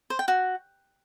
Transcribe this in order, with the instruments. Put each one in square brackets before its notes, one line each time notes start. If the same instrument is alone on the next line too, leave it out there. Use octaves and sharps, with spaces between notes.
[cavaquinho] C5
G5
F#4